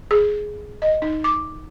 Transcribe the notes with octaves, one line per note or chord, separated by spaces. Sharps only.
G#4
D#5
D#4
D6